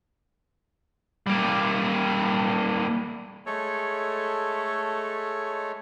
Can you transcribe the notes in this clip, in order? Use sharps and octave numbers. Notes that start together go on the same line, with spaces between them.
G3 A#3
G#3 A3 A4 C#5